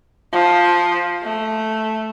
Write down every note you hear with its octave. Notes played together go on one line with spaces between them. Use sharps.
F3
A3